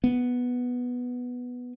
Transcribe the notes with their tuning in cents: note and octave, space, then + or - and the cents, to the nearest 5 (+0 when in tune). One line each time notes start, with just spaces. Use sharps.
B3 +0